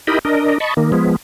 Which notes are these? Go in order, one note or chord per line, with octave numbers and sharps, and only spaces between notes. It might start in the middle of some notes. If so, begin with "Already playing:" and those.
D#4 E4 G4 A#4 D#5 B5
D4 A#4 D#5
D#5 A5 B5 C#6
D#3 A#3
F3 G#3 B3